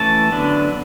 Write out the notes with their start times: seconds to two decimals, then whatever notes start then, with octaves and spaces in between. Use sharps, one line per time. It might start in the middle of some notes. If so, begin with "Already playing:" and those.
Already playing: E3 A3 C#4 A5
0.32 D3 F#3 B3 D4